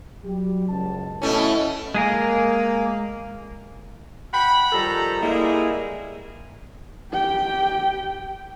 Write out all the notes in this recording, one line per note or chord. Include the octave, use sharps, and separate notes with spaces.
F#3 G3 G4
F#1 C#2 A5
B2 A3 C#4 E4
G#3 A#3 G#4 A#4
F#5 G5 B5
D#3 F3 G3 A4 A#5
G3 G#3 A#3 E4 G#4
G4 G5